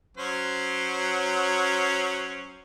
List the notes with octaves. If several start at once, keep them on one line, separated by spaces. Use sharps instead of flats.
F#3 C#4 C5